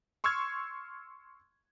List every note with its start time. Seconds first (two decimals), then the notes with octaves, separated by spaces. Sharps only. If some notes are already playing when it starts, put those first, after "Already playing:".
0.24 C6 C#6 E6 F6 G#6